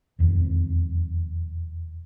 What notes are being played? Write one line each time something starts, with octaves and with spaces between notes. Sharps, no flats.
E1 F2 D#3